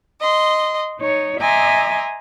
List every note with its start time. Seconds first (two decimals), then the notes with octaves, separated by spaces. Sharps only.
0.19 D#5 C6
1.00 D#4 C#5
1.39 D#5 E5 G#5 A#5 C6 D6